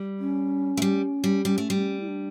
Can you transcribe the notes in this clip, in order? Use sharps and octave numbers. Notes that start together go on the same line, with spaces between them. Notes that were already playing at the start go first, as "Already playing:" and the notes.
Already playing: G3
C#4
A3
G3
G3
G3 C#4
A3
G3
C#4
E4
D4